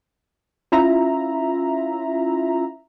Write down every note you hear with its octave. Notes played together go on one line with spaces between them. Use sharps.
C#4 E4 F4 E5 A#5